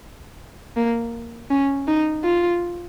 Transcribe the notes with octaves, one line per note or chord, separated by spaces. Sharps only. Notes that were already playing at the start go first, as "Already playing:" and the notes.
A#3
C#4
D#4
F4